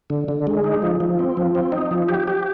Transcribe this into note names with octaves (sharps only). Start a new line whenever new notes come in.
D3
D3
G#3
D#4
F3
F3
C4
F3
C4
D#4
F3
G4
G4